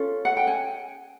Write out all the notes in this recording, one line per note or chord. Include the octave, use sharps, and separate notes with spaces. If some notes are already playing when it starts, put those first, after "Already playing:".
Already playing: C#4 F4 A4
F#5
G5
G#5